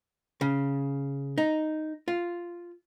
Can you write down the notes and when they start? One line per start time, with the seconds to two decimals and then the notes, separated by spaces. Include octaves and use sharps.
0.41 C#3
1.38 D#4
2.08 F4